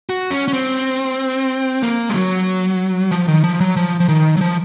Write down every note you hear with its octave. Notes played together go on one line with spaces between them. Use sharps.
F#4
C#4
C#4
C4
A#3
G#3
F#3
F3
D#3
F3
F#3
F3
F3
D#3
F#3
F3